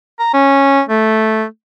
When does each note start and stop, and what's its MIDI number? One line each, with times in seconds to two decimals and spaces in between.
0.20 0.29 82
0.34 0.82 61
0.89 1.45 57